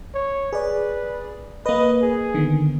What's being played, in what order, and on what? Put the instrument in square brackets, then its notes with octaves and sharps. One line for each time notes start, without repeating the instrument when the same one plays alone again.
[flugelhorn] C#5
[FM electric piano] G#4 D5 [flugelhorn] B4
[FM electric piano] A#3 B4 [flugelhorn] D#5
[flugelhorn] G#4
[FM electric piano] D3 D#3 B3